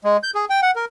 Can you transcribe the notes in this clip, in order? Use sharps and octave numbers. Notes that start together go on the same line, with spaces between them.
G#3
G6
G#4
G5
F#5
A#4